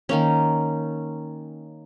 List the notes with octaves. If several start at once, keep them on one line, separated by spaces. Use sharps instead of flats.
D#3 A#3 C#4